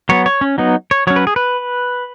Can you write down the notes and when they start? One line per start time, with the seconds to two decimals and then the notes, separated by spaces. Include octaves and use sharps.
0.09 F#3 B3 C#5
0.26 C#5
0.41 C#4
0.58 F#3 B3 D#4
0.91 C#5
1.07 F#3 C#4 C#5
1.16 B4
1.27 G#4
1.36 B4